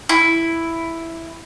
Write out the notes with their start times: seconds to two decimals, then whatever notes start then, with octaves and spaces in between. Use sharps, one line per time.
0.09 E4